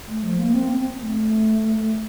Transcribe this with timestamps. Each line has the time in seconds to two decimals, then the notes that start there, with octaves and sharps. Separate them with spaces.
0.08 A3
0.23 F3
0.38 A#3
0.53 C4
0.69 C4
1.00 A3